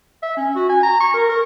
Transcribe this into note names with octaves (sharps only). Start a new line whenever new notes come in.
E5
C#4
F#4
G#5
A#5
C#6
A#4
A#4